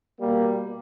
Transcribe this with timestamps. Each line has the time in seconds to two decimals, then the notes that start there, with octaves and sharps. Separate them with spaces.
0.20 B2 G3 A#3